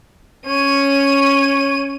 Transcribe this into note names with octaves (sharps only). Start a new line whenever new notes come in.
C#4 C#5 D#7